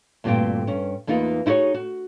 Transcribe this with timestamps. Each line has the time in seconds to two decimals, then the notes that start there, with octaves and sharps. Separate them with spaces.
0.24 D2 G2 A#2 C4 G4 G5
0.67 G2 C#4
1.07 E2 A#3 D#4 F4 B4
1.46 D#4 E4 F#4 G#4 C#5
1.74 F#4